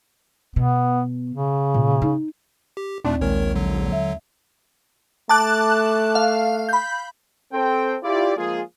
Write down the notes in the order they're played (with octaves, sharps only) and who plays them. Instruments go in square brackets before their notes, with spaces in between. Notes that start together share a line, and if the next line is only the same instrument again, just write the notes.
[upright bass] B2 [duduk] B3
[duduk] C#3
[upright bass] A#2
D#4
[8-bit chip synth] G4
[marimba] D#2 C4 D5 [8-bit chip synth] A#2 A3 [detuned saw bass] D4
[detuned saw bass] A#1 [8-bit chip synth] D#3 A#4 C#5 [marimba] G#3
[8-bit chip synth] D3 F#3
[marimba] E5
[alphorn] A3 [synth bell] A5 D6 F#6
[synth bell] F5
B5 G6
[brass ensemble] C4 A4 G5
E4 F4 G4 D5
F3 G#3 A#3 F4 G#4